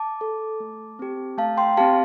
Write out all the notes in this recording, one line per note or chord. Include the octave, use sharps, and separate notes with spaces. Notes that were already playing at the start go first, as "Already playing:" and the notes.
Already playing: A5 D6
A4
A3
C4 G4
A3 F5 A5
G5 C6
C4 G4 F5 A5